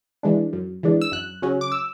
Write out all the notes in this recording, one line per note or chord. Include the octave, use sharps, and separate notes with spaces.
E3 G#3 D4
F#2
E3 G#3 D4
E6
F#2 F#6
C#3 F#3 C#4
D6
E6